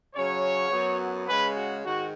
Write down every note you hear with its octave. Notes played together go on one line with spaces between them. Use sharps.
C#3 F#3 C#4 C#5
F#2 F#3 B3
C#3 G#3 C#4 B4
F#4
G#2 D#3 F#4